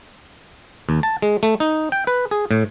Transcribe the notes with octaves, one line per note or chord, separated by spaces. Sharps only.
D#2
A5
G#3
A3
D#4
G5
B4
G#4
A2